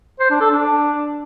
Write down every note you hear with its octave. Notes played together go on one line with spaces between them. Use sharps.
C5
D4
A4
D4